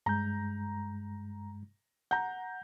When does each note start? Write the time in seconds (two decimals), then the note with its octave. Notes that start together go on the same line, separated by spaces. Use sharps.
0.06 G2 G#3 A#5 G6
2.11 F#5 A#5 G6